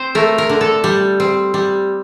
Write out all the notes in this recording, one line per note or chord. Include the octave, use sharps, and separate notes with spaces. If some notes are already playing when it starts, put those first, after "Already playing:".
Already playing: C4 C5
A3 A#4
A#4
D3
A4
G3
C4
G3